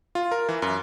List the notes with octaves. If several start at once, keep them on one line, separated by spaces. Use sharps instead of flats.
F4
A#4
E3
F#2